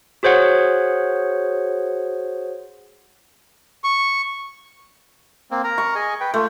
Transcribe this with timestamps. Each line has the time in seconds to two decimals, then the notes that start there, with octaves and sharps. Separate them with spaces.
0.23 F#4 G#4 C5 C#5 F#5
3.84 C#6
5.51 A#3 C4
5.64 A#4 A#5
5.78 C#6
5.95 G#4 D#5 G#5
6.20 B4 G5
6.34 A3 F4